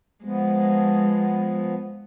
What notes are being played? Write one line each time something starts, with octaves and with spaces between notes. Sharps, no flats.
F3 G#3 B3